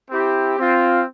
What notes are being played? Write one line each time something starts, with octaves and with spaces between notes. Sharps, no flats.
C4 E4 G4
C4 F4